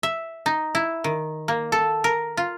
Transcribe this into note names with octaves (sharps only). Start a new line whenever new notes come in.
E5
D#4
E4
D#3
A#3
A4
A#4
F4